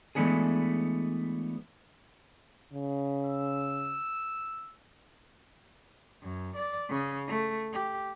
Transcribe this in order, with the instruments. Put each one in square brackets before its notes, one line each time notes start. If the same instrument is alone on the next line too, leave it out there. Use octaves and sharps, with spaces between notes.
[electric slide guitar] E3 G#3 A3 B3 D4 G#4
[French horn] C#3
[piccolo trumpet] E6
[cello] F#2
D5
C#3
A3
G4